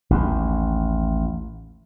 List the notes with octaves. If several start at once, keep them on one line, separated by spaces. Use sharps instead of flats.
A1 D#2